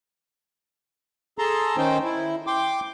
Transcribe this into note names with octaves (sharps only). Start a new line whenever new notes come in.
G#4 A4 A5 A#5 C6
D#3 C#4 D#4 C5 G5
E4
G5 C6 D6